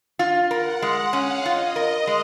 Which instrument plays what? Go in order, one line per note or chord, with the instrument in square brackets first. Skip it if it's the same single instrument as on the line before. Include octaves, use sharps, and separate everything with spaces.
[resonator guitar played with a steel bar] F4
[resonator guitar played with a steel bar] A#4 [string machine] F#5
[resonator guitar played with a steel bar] G#3
[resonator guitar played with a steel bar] C#4 [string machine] F5
[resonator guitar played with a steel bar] F4 [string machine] D#5
[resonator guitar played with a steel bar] A#4
G#3